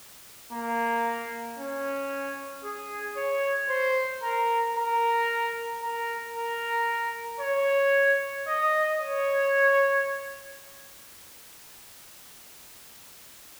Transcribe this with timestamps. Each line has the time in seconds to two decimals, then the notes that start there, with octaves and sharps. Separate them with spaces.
0.52 A#3
1.58 C#4
2.64 G#4
3.17 C#5
3.69 C5
4.22 A#4
4.76 A#4
5.82 A#4
6.35 A#4
7.40 C#5
8.47 D#5
9.00 C#5